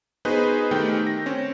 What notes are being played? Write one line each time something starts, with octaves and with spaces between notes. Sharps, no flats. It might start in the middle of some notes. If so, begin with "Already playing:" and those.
B3 D#4 F#4 G#4 B4 C5
D#3 A3 G4 G5 G6
A#6
C4 C#4